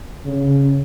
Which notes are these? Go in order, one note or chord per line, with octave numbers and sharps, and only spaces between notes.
C#3